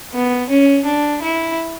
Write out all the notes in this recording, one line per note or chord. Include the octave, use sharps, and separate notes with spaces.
B3
C#4
D4
E4